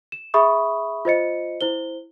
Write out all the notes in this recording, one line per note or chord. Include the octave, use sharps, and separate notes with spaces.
E7
G#4 E5 B5 C#6 D#6
F4 C5 D#5 C#7
E4 C5 G7